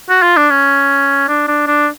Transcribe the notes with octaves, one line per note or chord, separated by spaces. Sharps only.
F#4
F4
D4
C#4
D4
D4
D4